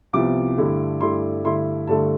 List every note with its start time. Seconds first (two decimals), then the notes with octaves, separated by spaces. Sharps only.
0.13 C2 C3 F3 B3 E4 D6
0.57 G2 D3 A3 E4
1.00 G2 D3 A3 E4 C6
1.44 G2 D3 A3 E4 C6
1.87 G2 D3 A3 E4 A5